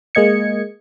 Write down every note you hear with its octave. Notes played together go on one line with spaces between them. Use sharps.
G#3 A#3 D#5 G#6 C#7